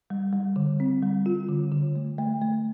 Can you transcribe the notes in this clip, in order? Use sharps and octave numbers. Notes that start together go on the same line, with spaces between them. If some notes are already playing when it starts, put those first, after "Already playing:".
G3
G3
D3
C4
G3
F4
D3
D3
A3
A3
A3